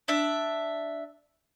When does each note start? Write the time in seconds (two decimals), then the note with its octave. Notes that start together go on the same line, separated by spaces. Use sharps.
0.08 D4 E5